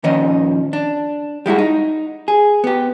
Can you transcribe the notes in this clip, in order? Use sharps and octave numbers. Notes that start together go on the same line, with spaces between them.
A#2 D#3 F3 C#4 D#5
D4
G3 G#3 E4 F#4
D#4
G#4
B3 G4